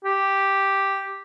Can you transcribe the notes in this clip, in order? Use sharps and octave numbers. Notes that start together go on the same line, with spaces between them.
G4